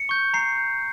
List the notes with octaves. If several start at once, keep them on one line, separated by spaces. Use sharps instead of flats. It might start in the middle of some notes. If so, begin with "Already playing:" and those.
Already playing: C#7
C#6 G6
A#5 C7
C#6 G6